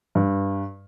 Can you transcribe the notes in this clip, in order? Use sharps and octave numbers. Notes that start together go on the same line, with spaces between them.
G2